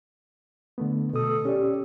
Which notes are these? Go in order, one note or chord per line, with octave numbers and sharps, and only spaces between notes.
D3 A3 B3
B2 A4 D#6
C#4 G4 D5